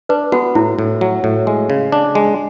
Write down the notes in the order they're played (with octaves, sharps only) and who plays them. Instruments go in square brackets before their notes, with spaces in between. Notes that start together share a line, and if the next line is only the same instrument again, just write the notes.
[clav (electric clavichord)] D4 [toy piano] B4
[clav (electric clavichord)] B3 [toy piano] F#4
[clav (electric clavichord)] A2 [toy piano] E4
[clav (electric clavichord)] A2
F#3
A2
G#3
C#3
D4
G#3